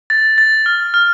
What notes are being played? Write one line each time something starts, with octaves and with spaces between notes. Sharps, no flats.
A6
A6
F6
F6